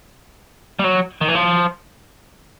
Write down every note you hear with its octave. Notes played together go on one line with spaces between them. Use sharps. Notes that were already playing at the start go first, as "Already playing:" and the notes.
G3
F#3
D#3
E3
F3